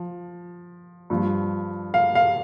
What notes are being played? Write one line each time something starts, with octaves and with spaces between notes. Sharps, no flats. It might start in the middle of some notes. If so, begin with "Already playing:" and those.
Already playing: F3
G2 F3
F5
F5